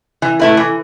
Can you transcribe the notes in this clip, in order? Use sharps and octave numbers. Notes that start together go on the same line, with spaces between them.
E3
A3 E4 B4
E3